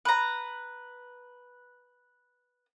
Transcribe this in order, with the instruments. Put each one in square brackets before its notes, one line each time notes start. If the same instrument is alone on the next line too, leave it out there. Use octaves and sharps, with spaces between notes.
[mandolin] B4 A#5